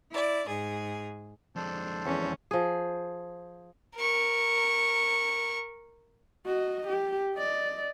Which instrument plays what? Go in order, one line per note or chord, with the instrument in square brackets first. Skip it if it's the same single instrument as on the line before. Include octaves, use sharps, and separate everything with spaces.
[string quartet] E4 D5
G#2 G#4
[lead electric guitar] F2 G#3 [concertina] D4 A4 C5
[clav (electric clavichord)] E2 [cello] C#4
[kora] F3 G#4
[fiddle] A#4 C#6
[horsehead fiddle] F#4 D#5
G4
D5 D#5